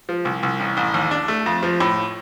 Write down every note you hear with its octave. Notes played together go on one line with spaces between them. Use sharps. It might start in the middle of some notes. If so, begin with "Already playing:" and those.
F3
C2
C2
A1
A1
D#2
D4
A3
F2
F3
A2